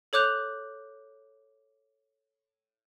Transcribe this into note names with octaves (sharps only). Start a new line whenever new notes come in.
A4 C#5 D6 F#6 G6 F7